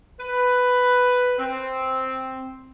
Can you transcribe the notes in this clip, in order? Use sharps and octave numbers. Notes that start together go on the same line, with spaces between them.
B4
C4